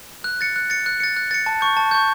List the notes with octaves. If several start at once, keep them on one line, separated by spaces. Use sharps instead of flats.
F#6
A6 C#7
F#6
A6 C#7
F#6
A6 C#7
F#6
A6 C#7
A5
C#6 G6
A5
C#6 G6